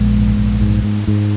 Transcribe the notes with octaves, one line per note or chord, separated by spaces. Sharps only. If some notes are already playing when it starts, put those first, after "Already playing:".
Already playing: A#1 G#3 B3
G#2
A#1
G#2
G#2
G#2